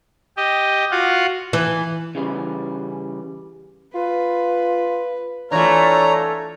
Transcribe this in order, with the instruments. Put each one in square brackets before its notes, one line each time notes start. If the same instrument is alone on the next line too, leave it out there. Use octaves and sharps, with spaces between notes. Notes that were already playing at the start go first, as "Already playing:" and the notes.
[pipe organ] G4 D#5
F4 F#4 F5 F#5
[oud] E3
[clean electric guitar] C#3 E3 G3
[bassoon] F4 [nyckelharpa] B4
[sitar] E3 A3 [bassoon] D4 [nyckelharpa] F4 [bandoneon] C#5 A#5